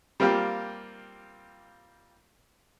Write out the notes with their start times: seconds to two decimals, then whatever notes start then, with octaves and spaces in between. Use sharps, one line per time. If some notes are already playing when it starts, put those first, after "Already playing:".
0.20 G3 A#3 C4 F4 G4